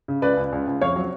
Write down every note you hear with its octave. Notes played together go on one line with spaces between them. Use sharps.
C#3
C#2 B4 D5
C#2
C#2
C#2
F2 C#5 F5
F#3